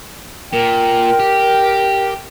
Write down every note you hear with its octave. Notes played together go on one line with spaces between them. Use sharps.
A#2 A#4 G5
G4